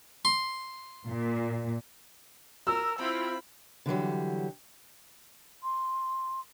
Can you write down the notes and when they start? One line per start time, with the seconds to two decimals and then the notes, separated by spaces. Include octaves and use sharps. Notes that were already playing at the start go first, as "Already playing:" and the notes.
0.25 C6
1.07 A#2
2.67 A#4 E6
2.99 C4 E4 F4 B5
3.86 D3 E3 F#3 G3
5.63 C6